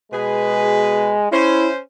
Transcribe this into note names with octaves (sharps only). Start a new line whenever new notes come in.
B2 G#3 G#4 B4
C#4 E4 C5